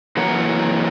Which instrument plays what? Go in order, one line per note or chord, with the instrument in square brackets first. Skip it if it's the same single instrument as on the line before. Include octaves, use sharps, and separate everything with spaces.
[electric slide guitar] E3 F#3 A#3 E4 F#5 A#5